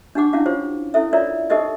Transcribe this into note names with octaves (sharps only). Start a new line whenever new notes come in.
D4 D#4 G4 F#5 D6
C#4 D4 E4 F5 F#5
F4 G4 C5 C#5
C#4 E4 A4 E5
F4 A#4 C#5 D5 E5 A#5
D#4 G4 A4 A#4 D#5 E5